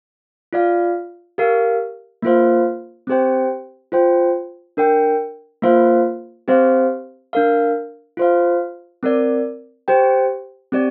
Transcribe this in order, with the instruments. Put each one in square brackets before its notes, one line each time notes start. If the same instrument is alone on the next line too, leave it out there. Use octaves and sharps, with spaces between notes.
[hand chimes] F4 D5 F5
G4 A#4 F5
A#3 F4 C5 F5
C4 G4 C5 G5
F4 C5 G5
D4 A#4 G5
A#3 F4 C5 F5
C4 G4 C5 F5
D4 A#4 F5
F4 C5 F5
C4 A#4 D5
G4 C5 G5
C4 G4 D5